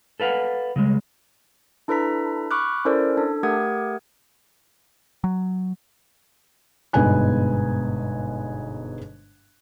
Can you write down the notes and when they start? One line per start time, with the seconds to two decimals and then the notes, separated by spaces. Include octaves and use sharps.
0.20 A4 B4 F5 F#5
0.76 C#3 G3 G#3
1.88 D4 E4 A4 B4 A#5 B6
2.51 B5 C#6 D6 F6 F#6
2.85 C#4 E4 A4 A#4 C5 D5
3.17 D4 A4
3.43 A3 G4 A#4 F#5 D#6 G#6
5.24 F#3
6.93 G1 G#2 B2 B4 G#5 F#6